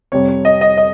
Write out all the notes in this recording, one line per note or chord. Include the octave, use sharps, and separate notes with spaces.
F2 C3 G3 C#5
C#5
D#5
D#5
D#5